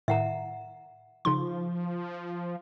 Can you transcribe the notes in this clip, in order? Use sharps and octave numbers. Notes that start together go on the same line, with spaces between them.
A2 D#3 E5 F#5 A#5
C#3 F3 D#4 C6